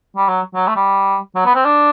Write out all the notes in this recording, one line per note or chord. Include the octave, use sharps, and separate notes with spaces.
G3
F#3
F#3
A3
G3
F#3
B3
C4
D4